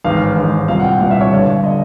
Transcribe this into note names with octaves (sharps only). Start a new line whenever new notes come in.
A1 G#2 D#3 F5
A1 G#2 D#3
C2 A#2 F5
F#5
G5
C2 A#2 F5
E5
C#5
G1 G2 D3 D5
D3 D#5